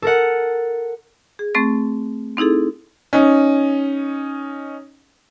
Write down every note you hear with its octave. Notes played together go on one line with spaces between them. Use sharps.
A4 A#4 F#5
G#4
A3 C4 C#6 A6
C4 D#4 E4 G#4 A4
C#4 D#4